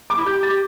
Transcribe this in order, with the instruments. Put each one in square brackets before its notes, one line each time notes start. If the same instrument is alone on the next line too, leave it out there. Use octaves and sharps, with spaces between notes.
[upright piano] D6
[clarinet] E4
[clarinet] G4 [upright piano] G6
[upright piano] A6
[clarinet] G4